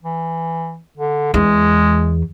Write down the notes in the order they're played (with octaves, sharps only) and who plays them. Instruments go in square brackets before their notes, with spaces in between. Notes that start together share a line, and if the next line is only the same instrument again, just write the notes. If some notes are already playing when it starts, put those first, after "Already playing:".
[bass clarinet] E3
D3
[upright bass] E2 [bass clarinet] G#3